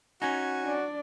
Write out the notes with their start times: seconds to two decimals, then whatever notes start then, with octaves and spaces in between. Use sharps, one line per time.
0.22 C#4 D#4 F#4 G#5
0.63 D4 D5